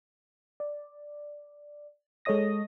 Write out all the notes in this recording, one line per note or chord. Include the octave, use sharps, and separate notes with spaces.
D5
G#3 A4 C#5 D#5 D#6 A#6